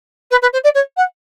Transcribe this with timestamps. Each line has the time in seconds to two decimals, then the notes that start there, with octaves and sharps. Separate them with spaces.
0.31 B4
0.42 B4
0.53 C5
0.64 D5
0.75 C#5
0.97 F#5